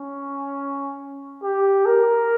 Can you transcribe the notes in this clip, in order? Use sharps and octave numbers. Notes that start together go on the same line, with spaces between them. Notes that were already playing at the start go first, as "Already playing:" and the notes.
Already playing: C#4
G4
A#4